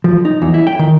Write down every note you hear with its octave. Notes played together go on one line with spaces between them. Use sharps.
F3
D#4
E2
E4
G5
D#3